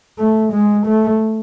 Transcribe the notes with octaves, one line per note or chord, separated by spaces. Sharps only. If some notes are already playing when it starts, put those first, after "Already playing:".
A3
G#3
A3